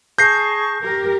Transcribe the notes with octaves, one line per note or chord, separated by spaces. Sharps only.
G#4 A5 C#6 G6 A#6 C7
G4 A#4